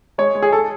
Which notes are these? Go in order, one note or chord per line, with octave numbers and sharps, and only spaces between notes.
G#3 C#5
G#3
G#4
A4